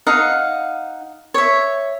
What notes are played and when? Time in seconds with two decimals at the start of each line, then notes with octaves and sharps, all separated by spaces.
0.07 D#4 F5 F#5
1.34 C#5 E5